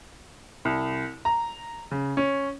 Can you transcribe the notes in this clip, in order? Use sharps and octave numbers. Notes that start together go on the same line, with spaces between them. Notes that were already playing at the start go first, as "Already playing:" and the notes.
C2
A#5
C#3
C#4